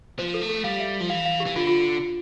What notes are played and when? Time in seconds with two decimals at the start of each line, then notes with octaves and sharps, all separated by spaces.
0.19 F3 C5
0.34 A4
0.41 A3
0.49 A4
0.64 G3 F5
0.80 E5
1.00 F3
1.10 E3 F5
1.25 F5
1.40 G4
1.46 E3
1.56 D3 F4
1.67 F4